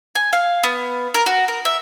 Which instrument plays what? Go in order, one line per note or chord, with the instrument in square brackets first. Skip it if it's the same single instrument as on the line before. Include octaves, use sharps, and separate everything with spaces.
[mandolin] G#5
F5
B3
A#4
F#4
A#4
E5